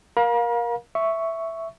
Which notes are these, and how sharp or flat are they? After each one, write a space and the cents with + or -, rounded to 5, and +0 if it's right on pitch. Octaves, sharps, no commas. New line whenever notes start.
A#4 +20 F5 +25 A#5 +45
E5 +0 C#6 +5